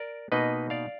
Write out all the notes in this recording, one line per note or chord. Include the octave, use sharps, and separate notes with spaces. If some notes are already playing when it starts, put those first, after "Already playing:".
Already playing: A#4 D5
B2 A#3 D#4 B4 D#5
D5 F5